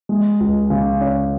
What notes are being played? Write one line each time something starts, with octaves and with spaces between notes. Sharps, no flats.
G#3
C#2
C#3
C#4